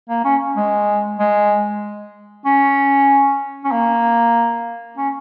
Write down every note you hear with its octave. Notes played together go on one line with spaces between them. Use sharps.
A#3
C#4
G#3
G#3
C#4
C#4
A#3
C#4